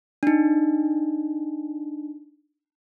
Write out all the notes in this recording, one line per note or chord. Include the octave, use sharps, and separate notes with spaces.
D4 D#4